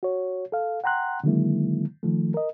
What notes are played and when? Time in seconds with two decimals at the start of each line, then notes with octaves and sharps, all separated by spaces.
0.03 F#4 C#5
0.52 A4 F5
0.84 F#5 G5 A#5 C6 F#6
1.24 D3 D#3 F#3 G#3 A#3 E4
2.03 D#3 F3 A3
2.34 A#4 D#5